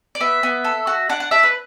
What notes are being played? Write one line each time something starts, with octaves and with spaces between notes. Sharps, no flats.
D5
B3 E5
B3
A4
F#4
D4 F#5
F#5
D4 E5
B4